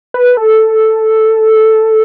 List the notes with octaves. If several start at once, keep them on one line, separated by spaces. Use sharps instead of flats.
B4
A4